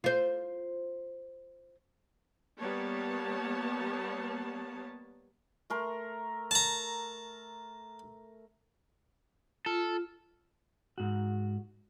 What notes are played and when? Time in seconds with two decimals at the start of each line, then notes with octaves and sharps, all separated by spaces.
0.04 F4 C5
2.59 G3 A#3 B3 C#5 A5
5.70 A3 A#4 C6
6.51 A5 A#5
9.66 F4 A4
10.98 G#2 F#4